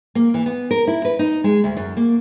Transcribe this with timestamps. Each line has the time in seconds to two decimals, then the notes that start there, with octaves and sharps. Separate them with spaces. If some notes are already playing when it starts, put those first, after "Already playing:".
0.15 A#3
0.34 E3
0.46 B3
0.71 A#4
0.87 E4
1.05 B4
1.19 D#4
1.44 G#3
1.64 D2
1.77 F#2
1.97 A#3